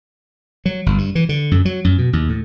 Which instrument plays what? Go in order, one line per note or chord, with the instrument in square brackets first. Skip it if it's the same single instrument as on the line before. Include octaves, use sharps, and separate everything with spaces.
[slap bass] F#3
G1
G2
E3
D3
F#2
F#3
F#2
B2
D#2
A2